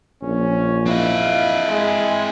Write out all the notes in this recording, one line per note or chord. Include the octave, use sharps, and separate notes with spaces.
A#1 C#4
C4 E4 D#5 F5 F#6
G#3